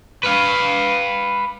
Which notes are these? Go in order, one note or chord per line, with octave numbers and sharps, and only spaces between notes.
B4 F5